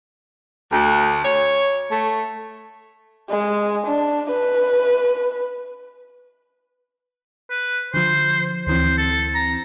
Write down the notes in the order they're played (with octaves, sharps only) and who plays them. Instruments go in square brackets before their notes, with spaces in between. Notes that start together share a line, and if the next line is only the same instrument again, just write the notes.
[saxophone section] D2
C#5
A3
[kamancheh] G#3
D4
B4
[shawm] B4
[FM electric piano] D3 F3 [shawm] C5
[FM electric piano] D2 E3 C4 [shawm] C5
[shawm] A4
A#5